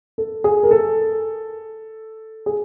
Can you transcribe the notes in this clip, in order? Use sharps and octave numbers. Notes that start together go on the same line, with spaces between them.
A4
G#4
A#4
A4
G#4